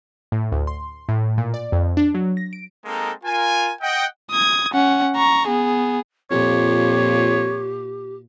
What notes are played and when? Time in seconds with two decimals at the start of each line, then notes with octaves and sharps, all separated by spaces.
0.32 A2
0.52 D2
0.67 C6
1.09 A2
1.38 A#2
1.54 D5
1.72 F2
1.97 D4
2.14 F#3
2.37 A#6
2.53 D7
2.85 G#3 A#3 C4 D#4 A4 A#4
3.24 F4 A#4 G#5
3.81 D#5 F#5 G5
4.31 D#6 G#6
4.74 C#4 F#5
5.17 A#5 C#6
5.48 B3 G#4
6.31 F2 A#2 G4 C#5